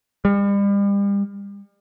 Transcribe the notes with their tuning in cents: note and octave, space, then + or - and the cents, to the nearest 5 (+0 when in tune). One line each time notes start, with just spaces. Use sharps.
G3 +40